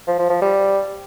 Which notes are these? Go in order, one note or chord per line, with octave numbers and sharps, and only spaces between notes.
F3
F3
F3
G3